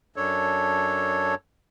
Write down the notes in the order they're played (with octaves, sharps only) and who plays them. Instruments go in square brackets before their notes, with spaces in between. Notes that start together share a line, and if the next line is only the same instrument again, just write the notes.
[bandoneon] F#2 D4 A4 C#5